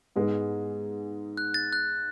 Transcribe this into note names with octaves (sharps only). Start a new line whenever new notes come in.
G#2 G#3 B3
F#6
A6
F#6